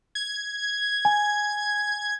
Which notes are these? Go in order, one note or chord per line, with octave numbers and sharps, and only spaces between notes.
G#6
G#5